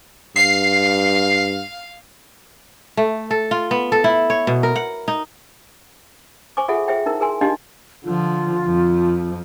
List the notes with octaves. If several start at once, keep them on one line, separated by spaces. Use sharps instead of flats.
G2 F5 C7
A3
A4
F4
B3
A4
E4
C#5
B2
A#4
F#5
D#4
C5 G#5 C#6 D6
F4 G#4 A4 E5 F#5
G#4 C5 E5 G5
D#4 E4 A#4
G#4 A#4 G#5 C6
D4 D#4 G4 D#5 F5 C6
D3 F3 F4
F2 F3